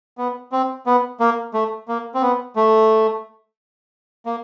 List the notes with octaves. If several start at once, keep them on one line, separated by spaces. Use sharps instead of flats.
B3
C4
B3
A#3
A3
A#3
C4
B3
A3
A#3